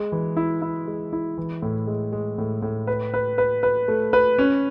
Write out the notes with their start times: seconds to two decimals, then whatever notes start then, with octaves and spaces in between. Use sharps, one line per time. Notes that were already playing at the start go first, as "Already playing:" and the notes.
Already playing: G#3
0.12 E3
0.37 E4
0.62 E4
0.87 G#3
1.13 E4
1.38 E3
1.62 A2
1.87 G#3
2.12 G#3
2.38 A2
2.62 A2
2.87 B4
3.14 B4
3.38 B4
3.63 B4
3.88 A3
4.13 B4
4.39 C#4